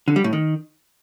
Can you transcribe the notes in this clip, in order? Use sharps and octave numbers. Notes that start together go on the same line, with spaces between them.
D3
G3
A2
D#3